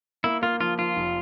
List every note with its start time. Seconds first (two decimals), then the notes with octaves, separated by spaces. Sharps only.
0.24 A#3 E4
0.42 A#3 F4
0.61 F3 F4
0.79 F3 F4
0.96 F1